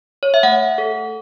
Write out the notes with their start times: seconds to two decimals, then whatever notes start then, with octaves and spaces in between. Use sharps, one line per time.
0.23 C#5
0.34 E5
0.43 A3 F#5
0.78 A4